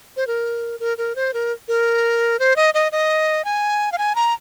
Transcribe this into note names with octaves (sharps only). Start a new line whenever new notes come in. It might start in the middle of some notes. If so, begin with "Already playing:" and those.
C5
A#4
A#4
A#4
C5
A#4
A#4
C5
D#5
D#5
D#5
G#5
F5
G#5
A#5